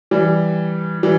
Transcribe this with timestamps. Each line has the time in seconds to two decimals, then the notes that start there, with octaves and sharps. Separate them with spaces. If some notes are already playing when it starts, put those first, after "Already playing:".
0.11 E3 G3
1.03 E3 G3